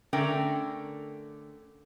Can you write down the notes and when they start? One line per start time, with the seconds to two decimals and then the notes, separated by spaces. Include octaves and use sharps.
0.13 D3 A3 C#4 D4 A#4 G5